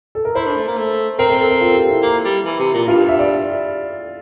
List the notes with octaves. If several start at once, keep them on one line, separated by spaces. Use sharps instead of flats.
A4
A#4
E4 C5
D4
A3
A#3
A3
C4 A#4
A#4
A4
A#4
F4
A4
G4
E4
A#3
G3
E3
C3
A#2
G2 F4
E5
D5